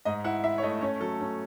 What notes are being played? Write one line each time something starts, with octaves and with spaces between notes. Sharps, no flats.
G#2 D#5
E4 F#5
E4 E5
C#5
A3 D#5
C#4 C#5
F#3 A4
C#4